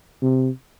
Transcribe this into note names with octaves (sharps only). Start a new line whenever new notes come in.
C3